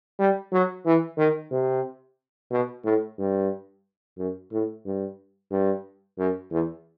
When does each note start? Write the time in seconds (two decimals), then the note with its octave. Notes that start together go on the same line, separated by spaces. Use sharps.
0.19 G3
0.52 F#3
0.86 E3
1.18 D#3
1.51 C3
2.51 B2
2.84 A2
3.18 G2
4.18 F#2
4.52 A2
4.85 G2
5.51 G2
6.18 F#2
6.51 E2